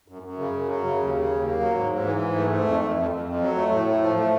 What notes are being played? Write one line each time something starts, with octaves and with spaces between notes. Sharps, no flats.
F#2
F#2
C#3
F#2
F#3
C#3
D#2
C#3
D#2
A#3
F#3
G#2
G#2
E3
G#2
A3
A3
F2
F2
F2
F2
F2
F#3
A3
A2
A3
F3
A3